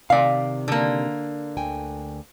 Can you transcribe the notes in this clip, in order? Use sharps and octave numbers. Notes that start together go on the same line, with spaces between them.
C3 D#3 D5 F5
D3 A#3
D2 G5 G#5